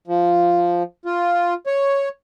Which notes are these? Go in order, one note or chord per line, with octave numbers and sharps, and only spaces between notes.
F3
F4
C#5